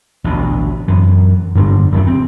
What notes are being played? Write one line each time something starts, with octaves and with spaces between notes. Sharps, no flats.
A1 D2 B2
F#2 E3
G2 D3 G3 G#3
D#1 F#2 A2 C#3
C4